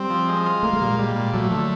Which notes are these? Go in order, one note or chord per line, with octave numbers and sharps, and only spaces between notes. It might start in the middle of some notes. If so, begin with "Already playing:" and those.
Already playing: G3 C4
F3
G#3
F4
A3 A#3
G#3
A#2 G3
G#3
G3
A#2
F#3 A3
D3 F#3